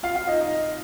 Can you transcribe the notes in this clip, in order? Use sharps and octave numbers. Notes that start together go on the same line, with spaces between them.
F4 F5
F4 F5
D#4 D#5
D#4 D#5